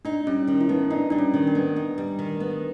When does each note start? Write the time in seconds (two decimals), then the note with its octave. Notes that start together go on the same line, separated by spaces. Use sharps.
0.05 D4 D#4
0.27 G3 C#4
0.47 D#3 C#4
0.61 E4
0.69 B3 D#4
0.90 D4 D#4
1.10 G3 D4
1.19 C#4
1.34 D#3
1.47 D4
1.55 B3
1.76 D#4
1.98 G3
2.19 D#3
2.40 B3